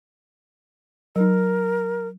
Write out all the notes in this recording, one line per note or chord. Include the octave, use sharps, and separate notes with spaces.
F#3 D#4 A#4